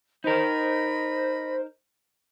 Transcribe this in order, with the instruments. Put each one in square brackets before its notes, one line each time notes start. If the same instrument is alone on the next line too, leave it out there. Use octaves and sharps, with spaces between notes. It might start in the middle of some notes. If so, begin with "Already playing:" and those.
[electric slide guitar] D#4 A#4 [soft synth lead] C5 [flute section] D#5 B5